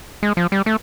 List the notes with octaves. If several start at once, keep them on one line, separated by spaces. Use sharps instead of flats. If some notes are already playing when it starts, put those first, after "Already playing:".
G#3
F3
G3
A3